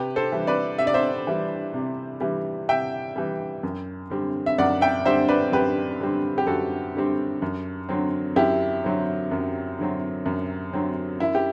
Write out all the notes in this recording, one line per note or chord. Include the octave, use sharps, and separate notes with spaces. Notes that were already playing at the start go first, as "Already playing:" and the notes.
Already playing: C3 G4 B4
A4 C5
E3 G3
B4 D5
C3 E5
D5
C5 E5
E3 G3
C3
E3 G3
C3 E5 G5
E3 G3
F#2
D3 G3 C4
E5
F#2 D5 F#5
E5 G5
D3 G3 C4 C5 E5
B4 D5
F#2 G4 B4
D3 G3 C4
G4
F#2 F#4 A4
D3 G3 C4
F#2
D3 F#3 C4
F#2 E4 G4
D3 F#3 C4
F#2
D3 F#3 C4
F#2
D3 F#3 C4
F#2 E4
G4